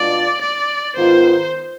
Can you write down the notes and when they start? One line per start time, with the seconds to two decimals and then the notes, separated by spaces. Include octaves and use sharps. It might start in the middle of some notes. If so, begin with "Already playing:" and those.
Already playing: B2 G#3 D4 F4 D5
0.42 D5
0.96 G#2 D#3 B3 F4 C5